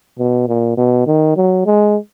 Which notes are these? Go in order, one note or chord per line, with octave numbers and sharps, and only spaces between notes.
B2
A#2
B2
D#3
F#3
G#3